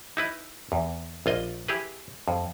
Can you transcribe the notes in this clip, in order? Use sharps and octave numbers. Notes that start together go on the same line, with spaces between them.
D#4 E4 B4
E2
A#1 F4 D#5
E4 G4 G#4 B4
F2